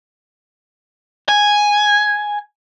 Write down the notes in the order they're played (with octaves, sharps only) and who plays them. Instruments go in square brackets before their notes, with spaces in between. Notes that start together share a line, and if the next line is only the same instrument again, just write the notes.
[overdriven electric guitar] G#5